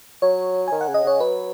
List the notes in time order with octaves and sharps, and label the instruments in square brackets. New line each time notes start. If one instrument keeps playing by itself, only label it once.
[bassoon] F#3 [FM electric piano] C#5
[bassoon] D#3 [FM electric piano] G#5
[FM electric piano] F#5
[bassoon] C#3
[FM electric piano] D#5
[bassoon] C#3 [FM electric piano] C#5
[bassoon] F#3 [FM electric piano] B4